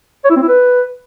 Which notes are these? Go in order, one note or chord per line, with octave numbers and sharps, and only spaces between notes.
C#5
E4
C4
E4
B4